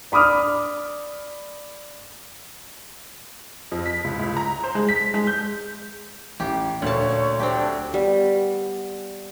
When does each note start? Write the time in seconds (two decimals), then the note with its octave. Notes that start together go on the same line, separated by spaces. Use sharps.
0.12 D4 B5 D6 D#6 F6
3.72 F2
3.86 B6
4.04 C#2
4.19 C#2
4.37 A#5
4.64 C5
4.75 G#3
4.89 B6
5.14 G#3
5.27 G6
6.40 A1 G4
6.82 D2 A#2 C#5 A5
7.40 C4 D4 G4
7.94 G3 B3